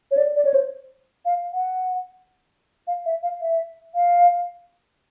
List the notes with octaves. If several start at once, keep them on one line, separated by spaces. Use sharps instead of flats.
C#5
D5
D5
C#5
C5
F5
F#5
F5
E5
F5
E5
F5